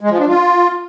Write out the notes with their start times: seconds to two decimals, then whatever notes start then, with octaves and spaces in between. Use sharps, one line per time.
0.01 G#3
0.10 F3
0.19 D4
0.28 F4